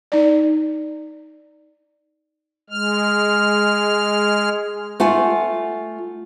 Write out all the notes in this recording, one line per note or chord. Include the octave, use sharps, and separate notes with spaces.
D#4 D5
G#3 F6
A3 F4 F#5 G#5